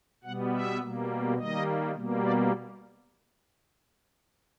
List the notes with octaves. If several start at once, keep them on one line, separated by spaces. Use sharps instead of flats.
B2 G3 B3 F#5
E5
B2 G3 A#3
D#3 G3 A#3 D#5
B2 G3 A#3
D5